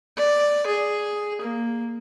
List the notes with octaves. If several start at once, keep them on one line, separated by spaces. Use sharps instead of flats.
D5
G#4
A#3